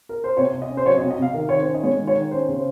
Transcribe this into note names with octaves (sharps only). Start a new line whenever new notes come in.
A#4
C5
C3 C#5
C3
D#5
C#4
C5
F#3 C#5
D#5
C3
D#5
C3 F5
D#3 A#4
D#3 C#5
C5
C#4
D#5
G#3 C#5
D#3
C#5
D#3
C#4 C5
C#3
C5